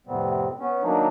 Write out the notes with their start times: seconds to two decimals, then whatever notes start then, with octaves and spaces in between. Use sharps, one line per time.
0.07 F2 A2 C3 G3 B3 C4
0.60 B3 C#4
0.83 D#3 F#3 A#3 D4 D#4